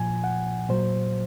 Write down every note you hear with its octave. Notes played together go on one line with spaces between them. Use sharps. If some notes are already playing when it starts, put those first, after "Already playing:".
Already playing: A#2 F3 G#5
F#5
A#2 F#3 C5